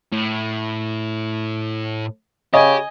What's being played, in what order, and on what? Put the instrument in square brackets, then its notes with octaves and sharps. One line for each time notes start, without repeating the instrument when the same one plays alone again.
[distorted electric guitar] A2
[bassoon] C#3 [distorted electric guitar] G4 [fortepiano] D#5 G#5